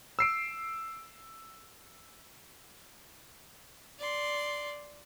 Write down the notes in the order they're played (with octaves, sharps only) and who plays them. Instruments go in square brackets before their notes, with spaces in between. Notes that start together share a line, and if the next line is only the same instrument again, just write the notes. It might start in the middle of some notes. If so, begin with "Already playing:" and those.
[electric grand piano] E6 C7 D7
[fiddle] D5 C6